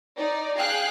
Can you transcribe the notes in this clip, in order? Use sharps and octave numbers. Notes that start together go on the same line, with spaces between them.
D#4 D5
G#4 F5 G5 F#6